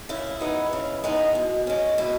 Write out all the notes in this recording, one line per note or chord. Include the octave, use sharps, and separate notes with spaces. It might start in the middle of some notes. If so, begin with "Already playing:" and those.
C#3 E4
G#3 B3 D#4
C#3
G#3 B3 D#4
B2
G#3 C#4
B2 E4